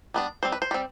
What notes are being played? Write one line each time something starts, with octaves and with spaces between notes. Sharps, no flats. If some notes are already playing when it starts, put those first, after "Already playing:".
G3 B3 D4
G3 C4 C5
B4
C5
G3 C4